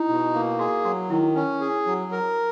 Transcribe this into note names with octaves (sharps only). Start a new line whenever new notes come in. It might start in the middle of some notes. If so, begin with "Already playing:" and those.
Already playing: D#4 E4
B2
A#3
F#4 G#4
F#3 F#4
D#3 E4
C#4
G#4
F#3
A#4